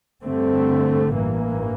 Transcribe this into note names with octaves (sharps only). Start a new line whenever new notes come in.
G2 D3 A3 C4
A1 G2 E3 A#3